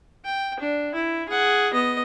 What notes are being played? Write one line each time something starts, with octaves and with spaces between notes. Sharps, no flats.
G5
D4
E4
G#4 F#5
B3 D#5